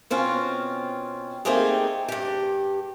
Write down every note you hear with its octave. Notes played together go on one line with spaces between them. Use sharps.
B2 C4 C#4 F4
A3 A#3 C4 D#4 G4 G#4
G2 G4